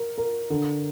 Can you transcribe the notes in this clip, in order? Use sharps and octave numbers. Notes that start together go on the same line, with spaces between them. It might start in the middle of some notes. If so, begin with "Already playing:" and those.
Already playing: A#4
A#4
D3